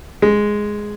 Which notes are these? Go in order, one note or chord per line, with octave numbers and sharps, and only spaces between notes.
G#3